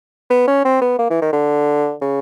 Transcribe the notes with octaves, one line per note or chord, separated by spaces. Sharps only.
B3
C#4
C4
B3
A#3
E3
D#3
D3
C#3